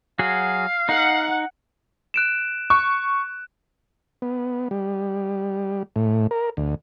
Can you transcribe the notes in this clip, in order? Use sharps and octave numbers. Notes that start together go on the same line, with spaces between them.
F#3 F#4 G#4 F5
D#4 F#5
F#6 D7 E7
C#6 F#6
B3
G3
A2
A#4
D2